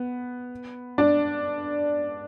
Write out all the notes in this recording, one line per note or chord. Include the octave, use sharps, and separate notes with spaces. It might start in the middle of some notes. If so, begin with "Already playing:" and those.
Already playing: B3
D4